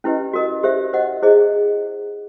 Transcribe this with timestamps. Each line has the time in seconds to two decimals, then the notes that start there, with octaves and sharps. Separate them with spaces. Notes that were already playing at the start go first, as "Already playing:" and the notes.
0.04 C#4 E4 G4 B4 D#5
0.33 F#4 A#4 D#5
0.63 G4 C5 E5
0.93 C5 D#5 F#5
1.22 E4 G#4 C5 D#5